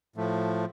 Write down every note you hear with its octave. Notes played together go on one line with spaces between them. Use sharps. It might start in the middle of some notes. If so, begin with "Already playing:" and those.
A2 F3 A3